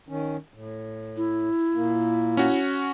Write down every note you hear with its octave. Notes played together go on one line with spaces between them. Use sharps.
D#3 C#4
A2
E4
A#2 A#3
C#4 F#4